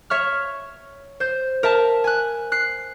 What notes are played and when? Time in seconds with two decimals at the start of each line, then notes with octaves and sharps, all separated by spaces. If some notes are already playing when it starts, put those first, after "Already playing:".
0.10 C#5 E5 C#6 F6
1.20 C5 G6
1.63 A#4 E5 A5
2.04 G#5 F#6
2.52 F#6 C7